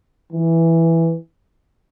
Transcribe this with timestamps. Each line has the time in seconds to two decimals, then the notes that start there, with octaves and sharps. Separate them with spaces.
0.32 E3